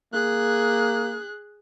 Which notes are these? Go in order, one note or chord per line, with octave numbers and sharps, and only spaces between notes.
A#3 G#4 F#6